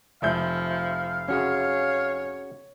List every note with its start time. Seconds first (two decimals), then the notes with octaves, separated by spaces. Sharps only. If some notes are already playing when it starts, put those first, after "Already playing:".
0.22 F1 F3 E5 F5 G6
1.28 C#4 F#4 G#4 C#5